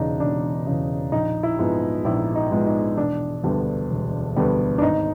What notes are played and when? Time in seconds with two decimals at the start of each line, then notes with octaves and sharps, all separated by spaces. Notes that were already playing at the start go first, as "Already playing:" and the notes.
Already playing: E1 E2 C#3 D4 D#4
0.20 E1 D4
0.67 E2 C#3
1.12 A#1 D#4
1.43 E4
1.59 G#2 F3 G#3 B3
2.04 A#1 E4
2.35 D#4
2.51 G#2 F3 G#3 B3
2.66 D#4
2.97 E1 D4
3.44 D2 D3 G3 B3
3.90 E1
4.36 D2 D3 G3 B3
4.78 D4
4.82 G#1 D#4